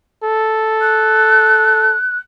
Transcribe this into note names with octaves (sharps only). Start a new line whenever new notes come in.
A4
F#6